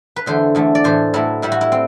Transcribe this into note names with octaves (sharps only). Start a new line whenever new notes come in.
B4
E2 D3 A3 C5
E2 D3 A3
D5
A2 E3 A3 C5
A2 F#3 A3 E4
A2 G3 E4
F#4
E4
C4